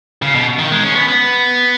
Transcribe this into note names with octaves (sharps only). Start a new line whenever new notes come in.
C#3
B2
D#3
G#3
C#4
B3
B3